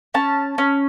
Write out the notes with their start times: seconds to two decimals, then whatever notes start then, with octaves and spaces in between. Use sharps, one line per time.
0.14 C#4 A5
0.58 C#4